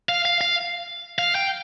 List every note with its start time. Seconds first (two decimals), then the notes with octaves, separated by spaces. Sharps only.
0.09 F5
0.25 F5
0.41 F5
1.19 F5
1.35 G5